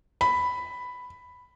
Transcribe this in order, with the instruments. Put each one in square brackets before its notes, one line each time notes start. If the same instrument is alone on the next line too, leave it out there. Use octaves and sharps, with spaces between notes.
[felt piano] B5